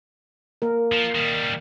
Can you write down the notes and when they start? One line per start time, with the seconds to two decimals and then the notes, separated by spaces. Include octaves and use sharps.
0.62 A#3 A#4
0.92 F3
1.15 D#3 G3